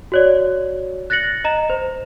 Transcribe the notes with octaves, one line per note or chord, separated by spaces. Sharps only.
F#4 C#5 D5
F#6 A6 A#6 C#7 F#7
D#5 A#5 E7
C5